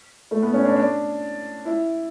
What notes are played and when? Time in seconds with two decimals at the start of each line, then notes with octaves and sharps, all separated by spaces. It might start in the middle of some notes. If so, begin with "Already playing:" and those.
0.31 A3
0.42 B3
0.53 C#4
0.65 D4
0.76 D4
1.65 E4